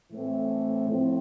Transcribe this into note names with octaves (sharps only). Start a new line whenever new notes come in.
A2 E3 A3 C4
A2 F3 C4